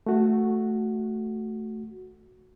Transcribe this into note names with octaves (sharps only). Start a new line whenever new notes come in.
A3 F#4